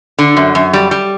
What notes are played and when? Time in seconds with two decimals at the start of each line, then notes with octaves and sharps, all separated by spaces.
0.19 D3
0.37 F#2
0.55 F#2
0.73 G3
0.91 G3